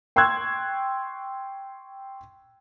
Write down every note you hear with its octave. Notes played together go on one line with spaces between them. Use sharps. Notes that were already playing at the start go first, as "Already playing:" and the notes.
G5 C6 C#6 E6 F#6 G#6